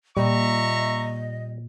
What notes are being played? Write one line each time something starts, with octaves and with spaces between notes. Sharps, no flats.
A#2 G3 D#5 E5 A#5 C#6